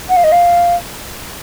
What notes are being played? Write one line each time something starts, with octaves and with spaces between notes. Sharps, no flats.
F#5
F5
D#5
F5